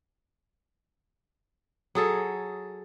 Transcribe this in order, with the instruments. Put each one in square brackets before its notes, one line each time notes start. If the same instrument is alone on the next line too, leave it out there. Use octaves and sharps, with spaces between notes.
[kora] F#3 G#4 A4